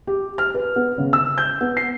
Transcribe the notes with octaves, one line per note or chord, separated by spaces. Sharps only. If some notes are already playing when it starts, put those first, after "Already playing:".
G4
F6
B4
B3
C#3
E6
G6
B3
C7